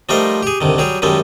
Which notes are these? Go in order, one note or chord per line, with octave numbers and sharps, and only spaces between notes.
F3 G3 A3 D#4 A#4 C5
G4 G#4
C2 D3 D#3
F#3 G3 G4 G#4
F#2 D#3 G3 G#3 A4